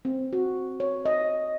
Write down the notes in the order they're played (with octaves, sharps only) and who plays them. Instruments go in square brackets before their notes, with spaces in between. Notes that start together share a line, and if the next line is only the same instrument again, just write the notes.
[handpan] C4
F#4
C#5
D#5